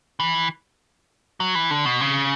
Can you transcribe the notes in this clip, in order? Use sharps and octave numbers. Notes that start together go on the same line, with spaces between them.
E3
F#3
E3
D3
B2
C#3